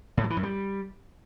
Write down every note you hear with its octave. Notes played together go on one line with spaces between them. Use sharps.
A2
F#3
E3
F#2
G3